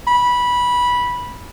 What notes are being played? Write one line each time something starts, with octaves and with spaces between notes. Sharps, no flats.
B5